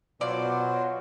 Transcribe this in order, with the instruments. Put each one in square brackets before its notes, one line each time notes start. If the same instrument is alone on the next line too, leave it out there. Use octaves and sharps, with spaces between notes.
[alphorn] B2 [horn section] F#3 [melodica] F4 C5 [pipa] D5